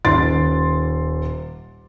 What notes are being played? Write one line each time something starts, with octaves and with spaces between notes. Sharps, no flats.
D#1 C6 A6